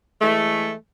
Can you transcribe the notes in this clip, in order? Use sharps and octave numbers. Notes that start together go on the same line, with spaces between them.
E3 G#3 A3